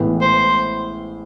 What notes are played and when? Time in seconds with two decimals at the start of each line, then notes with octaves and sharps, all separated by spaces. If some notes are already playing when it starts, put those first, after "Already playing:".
Already playing: A1 A2 E3 G#3 B3
0.21 C5